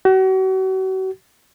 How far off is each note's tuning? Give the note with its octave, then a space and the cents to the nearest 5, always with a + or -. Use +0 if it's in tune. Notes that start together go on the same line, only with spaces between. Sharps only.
F#4 +40